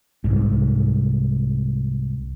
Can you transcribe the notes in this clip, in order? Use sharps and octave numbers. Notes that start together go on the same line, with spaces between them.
C2 G#2